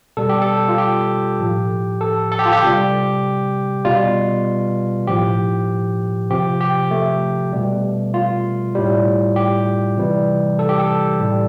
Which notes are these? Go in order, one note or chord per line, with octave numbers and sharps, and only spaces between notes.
B2 G3 A4
G4
A4
F4
G4
A2 F3
A4
A4
G4
F4
G4
C3 G3
B2 G3 F4
A2 F3 G4
C3 F3 G4
G4
A3
B2 G3
F4
A2 G3
G4
C3 E3 G3
A4
G4
A4
A2 G3